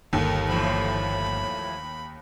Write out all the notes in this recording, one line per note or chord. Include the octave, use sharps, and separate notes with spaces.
G1 D#2 A4 A#4
A2 E3 F3 B5